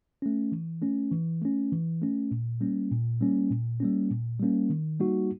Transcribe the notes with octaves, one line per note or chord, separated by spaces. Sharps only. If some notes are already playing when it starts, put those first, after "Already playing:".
A3 C#4
E3
A3 C#4
E3
A3 C#4
E3
A3 C#4
A#2
G3 A#3 C#4
A#2
G3 A#3 C#4
A#2
G3 A#3 C#4
A#2
G3 A#3 C#4
D#3
G3 A#3 D#4 F#4